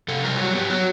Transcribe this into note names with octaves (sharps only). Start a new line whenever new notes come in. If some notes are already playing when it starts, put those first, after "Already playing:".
C3 A4
G3 A#4
F#3 F#4
B3 G4
F#3 F#4